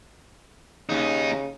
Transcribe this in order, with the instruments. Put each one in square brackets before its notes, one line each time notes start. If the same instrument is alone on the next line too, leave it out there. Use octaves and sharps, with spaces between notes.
[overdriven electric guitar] D#2 D#4 [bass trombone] C#3